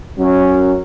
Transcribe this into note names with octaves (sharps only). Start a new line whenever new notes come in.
F#2 F#3 C#4